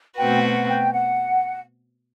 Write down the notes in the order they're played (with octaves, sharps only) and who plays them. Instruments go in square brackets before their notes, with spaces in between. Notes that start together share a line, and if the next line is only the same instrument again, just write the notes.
[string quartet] B2 A3 C4 F#4 B4 [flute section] G5
[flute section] F#5
G5
F#5